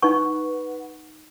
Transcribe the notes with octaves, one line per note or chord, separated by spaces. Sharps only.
D#4 B4 F#5 C#6